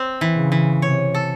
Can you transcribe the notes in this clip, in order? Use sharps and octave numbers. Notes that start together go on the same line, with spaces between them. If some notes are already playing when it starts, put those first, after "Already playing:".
Already playing: C4
E3
C#3
E3
C3 C#5
A4